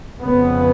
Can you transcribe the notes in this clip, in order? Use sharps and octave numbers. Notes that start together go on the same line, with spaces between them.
F2 C#3 B3